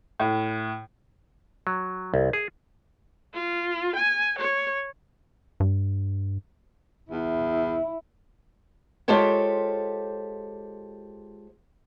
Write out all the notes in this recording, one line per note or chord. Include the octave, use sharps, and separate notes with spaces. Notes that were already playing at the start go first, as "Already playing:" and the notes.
A2
F#3
C2
G#4
F4
G#5
C#5
G2
E2 E4
G#3 F4 G4 A4 C5 C#5